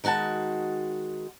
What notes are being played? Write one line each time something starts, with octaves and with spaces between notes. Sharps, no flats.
D#3 G#3 F#4 G5 A5